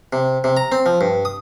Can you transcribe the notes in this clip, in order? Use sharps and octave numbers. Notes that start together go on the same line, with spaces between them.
C3
C3
A#5
C4
F3
G2
D#6